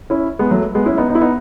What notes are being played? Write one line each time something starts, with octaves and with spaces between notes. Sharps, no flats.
C#4 E4
G#3 B3
F#3 A3
G#3 B3
C#4 E4
B3 D#4
B3 D#4
E4
B3 D#4